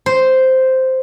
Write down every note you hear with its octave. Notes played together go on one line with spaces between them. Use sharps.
C5